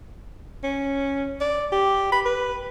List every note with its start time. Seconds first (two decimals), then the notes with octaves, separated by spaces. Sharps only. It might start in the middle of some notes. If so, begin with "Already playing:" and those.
0.64 C#4
1.41 D5
1.72 G4
2.12 B5
2.26 B4